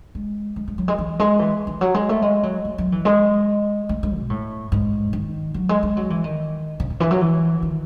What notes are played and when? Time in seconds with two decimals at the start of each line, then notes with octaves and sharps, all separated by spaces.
0.15 G#3
0.56 G#3
0.68 G#3
0.78 F#3
0.88 G#3
0.98 E3
1.20 G#3
1.39 E3
1.67 E3
1.81 F#3
1.94 G#3
2.09 A3
2.22 G#3
2.43 F#3
2.65 A3
2.78 F#3
2.92 E3
3.05 G#3
3.89 A3
4.03 G#3
4.17 B2
4.30 A2
4.72 G#2
5.13 D#3
5.54 F#3
5.69 G#3
5.83 G#3
5.97 F#3
6.10 E3
6.24 D#3
6.80 C#3
6.90 C#3
7.00 E3
7.11 F#3
7.21 E3
7.62 D#3